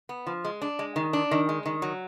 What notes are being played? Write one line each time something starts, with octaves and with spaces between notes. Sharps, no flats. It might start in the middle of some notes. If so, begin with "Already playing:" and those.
B3
F3
G#3
D4
G#3
D#3
D4
D#3
G#3
D#3
F#3